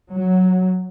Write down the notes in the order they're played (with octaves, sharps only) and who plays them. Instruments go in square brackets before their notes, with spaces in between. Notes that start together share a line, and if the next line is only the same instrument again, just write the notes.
[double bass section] F#3